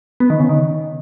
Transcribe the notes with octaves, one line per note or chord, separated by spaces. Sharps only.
B3
D#3
C#3
D#3